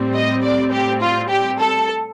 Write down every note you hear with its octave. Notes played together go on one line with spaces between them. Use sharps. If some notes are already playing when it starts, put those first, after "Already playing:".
Already playing: A2 G3 C4
D#5
D5
G4
F4
G4
A4